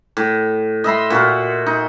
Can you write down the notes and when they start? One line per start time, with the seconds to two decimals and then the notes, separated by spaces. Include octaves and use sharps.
0.17 A2
0.84 D#5 E5 B5 C6
1.10 A#2 F#4 A#4
1.66 D#4